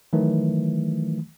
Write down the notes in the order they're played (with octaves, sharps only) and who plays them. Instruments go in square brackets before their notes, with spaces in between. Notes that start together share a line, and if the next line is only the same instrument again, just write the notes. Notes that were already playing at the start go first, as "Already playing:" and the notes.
[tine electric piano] D#3 E3 F#3 A3